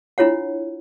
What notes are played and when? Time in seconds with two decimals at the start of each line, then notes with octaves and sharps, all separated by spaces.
0.18 D4 E4 F4 C#5 F#5